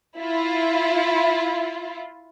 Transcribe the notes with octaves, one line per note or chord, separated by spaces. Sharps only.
E4 F4